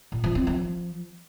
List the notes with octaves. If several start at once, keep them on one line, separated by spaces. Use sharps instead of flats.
A#2
F3
C4
F3